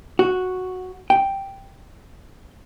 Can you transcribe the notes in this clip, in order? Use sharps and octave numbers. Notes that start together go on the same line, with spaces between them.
F#4
G5